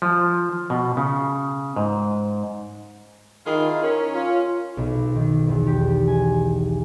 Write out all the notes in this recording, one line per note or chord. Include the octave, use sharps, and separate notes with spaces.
F3
B2
C#3
G#2
D#3 E4 F4 G#4
C#4 A#4
C#4 F4
B1
D#3
E2
G4
G#5